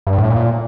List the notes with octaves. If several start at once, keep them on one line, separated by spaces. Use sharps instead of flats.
G2
A2
A#2